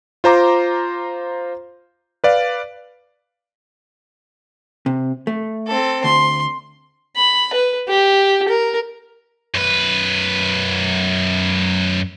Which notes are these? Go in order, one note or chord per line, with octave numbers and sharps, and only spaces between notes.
F4 C5 A#5 D6
B4 D5 F5
C3
A3
C4 A4
D2 C6
B5
B4
G4
A#4
F#2 B4